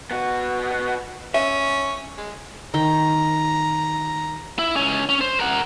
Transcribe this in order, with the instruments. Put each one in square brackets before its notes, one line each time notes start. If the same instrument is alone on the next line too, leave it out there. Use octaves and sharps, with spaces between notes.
[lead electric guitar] B3 F#4
[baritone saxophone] C#4 [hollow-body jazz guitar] E5
[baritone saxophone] G#3
[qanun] D#3 G5 [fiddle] A#5
[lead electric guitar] E4
C#2 C#4
C#4
C5
A#4 F#5